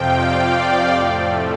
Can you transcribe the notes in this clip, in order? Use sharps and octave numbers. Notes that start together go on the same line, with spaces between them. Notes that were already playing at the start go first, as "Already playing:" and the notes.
Already playing: F2 C3 F3 F5 G5
D5
A2 F3 A3